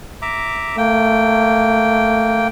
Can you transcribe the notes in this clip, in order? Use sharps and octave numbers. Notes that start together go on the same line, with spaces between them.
E5 A#5 D6
A3 A#3 G5